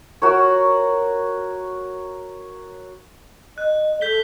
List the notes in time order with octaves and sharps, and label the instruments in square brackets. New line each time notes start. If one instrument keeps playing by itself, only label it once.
[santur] F#4 A#4 C#5
[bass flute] D#5 [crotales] F#6
[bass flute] A4 [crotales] G6 B6 G7